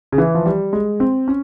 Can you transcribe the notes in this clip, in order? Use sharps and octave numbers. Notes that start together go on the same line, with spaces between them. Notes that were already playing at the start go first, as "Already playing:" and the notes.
C#3
E3
F3
G3
G#3
C4
C#4